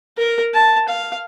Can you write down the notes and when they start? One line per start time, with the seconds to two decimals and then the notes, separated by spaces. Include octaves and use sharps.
0.18 A#4
0.54 A5
0.88 F5